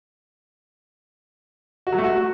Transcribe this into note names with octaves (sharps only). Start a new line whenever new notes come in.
F#4
F#3
A3
F#4